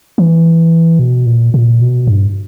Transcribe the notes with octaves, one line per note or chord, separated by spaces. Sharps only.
E3
B2
A#2
A#2
B2
G2